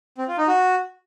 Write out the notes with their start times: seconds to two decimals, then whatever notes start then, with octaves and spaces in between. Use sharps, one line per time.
0.18 C4
0.28 F4
0.38 D#4
0.48 F#4